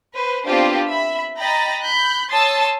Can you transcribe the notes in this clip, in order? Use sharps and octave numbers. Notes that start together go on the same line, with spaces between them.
B4 C5
B3 C4 D4 F4 G4 C5
E5 B5
D#5 G5 A#5 B5 A6
B5 F#6 G6
C#5 A5 C6 D#6 E6 A6